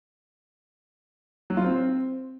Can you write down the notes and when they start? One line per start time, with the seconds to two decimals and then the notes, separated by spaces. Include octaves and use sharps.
1.50 F#3
1.57 F4
1.64 C4